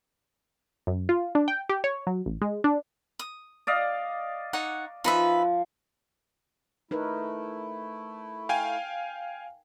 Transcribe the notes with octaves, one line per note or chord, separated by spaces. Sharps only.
F#2
F4
D4
G5
G4
C#5
F#3
A1
G#3
D4
D#6
D5 D#5 F5
D#4 C#5 F#5
F3 D#4 B4 E5
A3 D#4 E4 A#4 B4
F5 G5 G#5